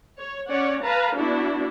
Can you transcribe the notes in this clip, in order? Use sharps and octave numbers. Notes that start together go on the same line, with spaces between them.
C#5
C#4 C#5 D5 F#5
B4 F5 A5 A#5
B3 D4 E4 F#4